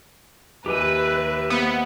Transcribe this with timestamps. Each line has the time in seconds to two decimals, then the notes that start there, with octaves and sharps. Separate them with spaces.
0.66 D#2 G4 B4 E5 G#5
1.50 A#3 B3 C5